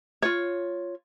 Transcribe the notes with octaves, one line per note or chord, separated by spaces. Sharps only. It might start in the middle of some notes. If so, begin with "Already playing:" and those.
F4 C#5